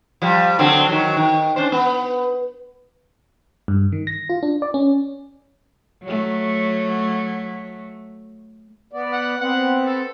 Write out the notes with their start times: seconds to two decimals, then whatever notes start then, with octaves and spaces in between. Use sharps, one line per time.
0.22 F3 G3
0.59 D3 F#3 C4
0.89 D#3 F#3
1.17 D#3
1.56 C#4 D4 C5
1.72 B3
3.68 G2
3.92 D#3
4.07 A#6
4.30 F4
4.43 D4
4.62 D5
4.74 C#4
6.03 F#3 A3
8.92 B3 D5
9.12 F#5
9.41 B3 C4 F#5
9.85 A4